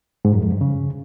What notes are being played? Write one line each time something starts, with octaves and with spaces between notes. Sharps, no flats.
G#2
F#2
F2
G2
C#3